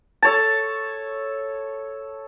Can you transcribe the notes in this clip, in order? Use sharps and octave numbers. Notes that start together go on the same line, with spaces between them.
A4 C#5 A5